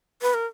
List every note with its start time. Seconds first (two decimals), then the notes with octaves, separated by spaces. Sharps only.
0.22 B4
0.34 A#4